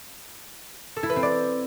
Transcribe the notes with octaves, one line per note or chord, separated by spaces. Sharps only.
A4
E4
B4
C4
D5